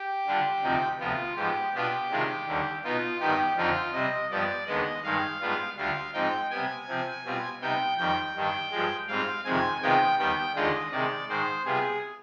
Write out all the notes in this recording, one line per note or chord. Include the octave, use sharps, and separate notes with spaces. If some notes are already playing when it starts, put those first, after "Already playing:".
Already playing: G4
D3 G3 D4 F4
D2 C3 F3 C4 D#4
D2 C3 F3 B3 F4
G#2 F3 B3 G4
B2 B3 D4 F4 G4
C3 D#3 G#3 D4 F4
D#2 D3 G3
B2 B3 D#4 F4
G2 D#3 B3 D#4 G4
F2 D3 F3 C4 D#4 F4
C3 G3 C4 D#5
G2 F3 B3 D5
D#2 D3 G#3 B3 D#5
G2 D#3 G#3 F5
G#2 G3 B3 D4 F4
D2 D3 G3 D4 F4 F5
G#2 F3 C4 D#4 G5
C3 G3 B3 G#5
C3 F3 C4
B2 G3 C4 F4
C3 G3 B3 D#4 G5
F2 D#3 G3 G5
G2 D#3 G3 D4
G2 F3 G#3
G#2 G3 C4 F4 F5
F2 C3 D#3 G#3 C4 G#5
C3 D#3 G#3 B3 F4 G5
D#2 D#3 G3 B3 G5
D#2 D3 G#3 D4 F4 D#5
C3 D#3 G#3 D5
G#2 D#3 G#3 C5
C3 G3 B3 F4 G#4